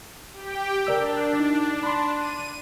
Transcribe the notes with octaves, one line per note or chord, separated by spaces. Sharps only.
G4 G5
D4 A#4 D5 E6
D#4
B5 C6
D#7